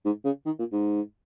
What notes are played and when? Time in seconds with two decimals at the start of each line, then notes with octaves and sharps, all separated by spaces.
0.05 G#2
0.25 C#3
0.46 D#3
0.59 A#2
0.73 G#2